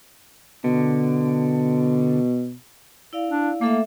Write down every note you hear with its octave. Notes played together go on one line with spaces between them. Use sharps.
B2 D3
E4 D5 F5
D4
A3 A#3 A4 E5